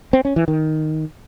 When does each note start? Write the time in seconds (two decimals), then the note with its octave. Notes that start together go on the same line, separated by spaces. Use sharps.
0.13 C4
0.25 C#4
0.36 E3
0.48 D#3